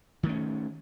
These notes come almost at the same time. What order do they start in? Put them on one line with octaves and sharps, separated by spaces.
D#3 A3 C#4